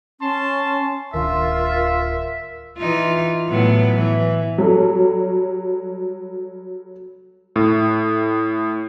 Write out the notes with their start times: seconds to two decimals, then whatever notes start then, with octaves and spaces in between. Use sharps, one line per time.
0.20 C#4 A5 C6
1.13 D1 D#3 D4 F4 A#4 E5
2.78 E3 D#4 F4
3.49 A2 F#3 B3
3.96 E3
4.58 F#3 G3 A4
7.56 A2